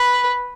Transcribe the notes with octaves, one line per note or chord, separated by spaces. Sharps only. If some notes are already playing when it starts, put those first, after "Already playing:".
Already playing: B4